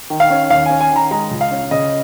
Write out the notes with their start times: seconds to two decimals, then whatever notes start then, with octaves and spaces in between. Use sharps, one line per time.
0.10 D#3
0.20 F5
0.30 C#4
0.50 D#2 F5
0.66 C#4 G#5
0.81 G#5
0.91 D#3
0.96 A#5
1.11 G#3 A#5
1.31 C#2
1.41 F5
1.51 C#4
1.71 C#3 D#5